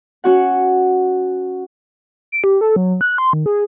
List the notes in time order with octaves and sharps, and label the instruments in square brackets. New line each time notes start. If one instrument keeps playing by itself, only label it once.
[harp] C#4 F#4 F#5
[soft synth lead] D7
G4
A4
F#3
F#6
C6
D#3
G#4